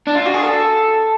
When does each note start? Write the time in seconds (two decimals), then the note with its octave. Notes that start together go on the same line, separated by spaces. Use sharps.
0.07 D4
0.15 F4
0.25 F#4
0.34 G#4
0.43 A4